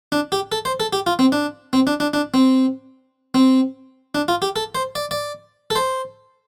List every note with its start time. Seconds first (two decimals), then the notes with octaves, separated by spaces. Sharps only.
0.12 D4
0.32 G4
0.52 A4
0.65 C5
0.80 A4
0.93 G4
1.06 F4
1.19 C4
1.32 D4
1.73 C4
1.87 D4
2.00 D4
2.13 D4
2.34 C4
3.34 C4
4.15 D4
4.28 F4
4.42 G4
4.56 A4
4.75 C5
4.95 D5
5.11 D5
5.70 A4
5.75 C5